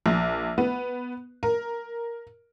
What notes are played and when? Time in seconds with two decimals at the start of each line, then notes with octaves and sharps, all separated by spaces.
0.06 A#1
0.58 B3
1.43 A#4